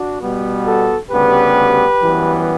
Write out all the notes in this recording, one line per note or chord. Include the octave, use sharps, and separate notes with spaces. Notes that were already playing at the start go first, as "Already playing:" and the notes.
Already playing: D4 F#4
B2 G3 B3
F#4 A4
D2 C#3 G3 B3 G4 B4
F#2 E3 G3 B3